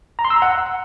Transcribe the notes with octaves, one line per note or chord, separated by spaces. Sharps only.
A#5
C6
E6
A#5
F#5